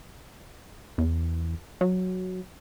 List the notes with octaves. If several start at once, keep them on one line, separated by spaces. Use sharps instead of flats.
E2
F#3